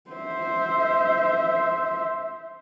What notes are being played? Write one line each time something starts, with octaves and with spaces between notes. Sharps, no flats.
C5 E5